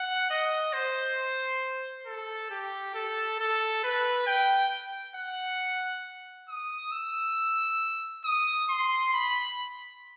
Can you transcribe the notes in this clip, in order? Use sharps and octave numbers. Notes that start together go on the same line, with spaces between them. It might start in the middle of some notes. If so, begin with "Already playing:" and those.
Already playing: F#5
D#5
C5
A4
G4
A4
A4
B4
G5
F#5
D#6
E6
D#6
C6
B5